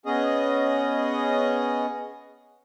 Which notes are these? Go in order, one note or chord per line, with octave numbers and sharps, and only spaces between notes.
B3 C#4 G#4 D#5